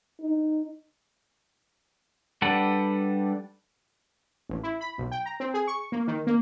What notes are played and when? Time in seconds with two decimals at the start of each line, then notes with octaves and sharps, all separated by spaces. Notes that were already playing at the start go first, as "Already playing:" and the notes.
0.21 D#4
2.42 G3 D4 A4 B4 F#5
4.49 A1
4.63 E4
4.81 B5
4.98 B1
5.12 G5
5.26 A#5
5.40 C4
5.54 G#4
5.67 C#6
5.92 A#3
6.08 D#3
6.27 A#3